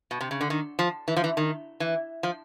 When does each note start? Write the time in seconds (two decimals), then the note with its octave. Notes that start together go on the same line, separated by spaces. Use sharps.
0.11 B2
0.21 C3
0.31 C#3
0.41 D3
0.50 D#3
0.79 F3
1.08 E3
1.16 F3
1.24 E3
1.37 D#3
1.80 E3
2.23 F3